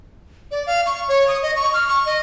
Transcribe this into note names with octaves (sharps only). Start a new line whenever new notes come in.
D5
F5
C#6
C#5
D#6
D#5
C#6
F6
C#6
D#5